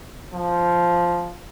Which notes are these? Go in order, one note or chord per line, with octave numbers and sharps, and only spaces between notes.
F3